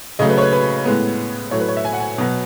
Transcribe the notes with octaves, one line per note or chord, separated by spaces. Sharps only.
C#3 F#3 A3 D#5
B4
C#5
B4
B4
A2 G#3 B3
A2 F#3 A3 C#5
B4
C#5
E5
G#5
F#5
G#5
B2 F#3 B3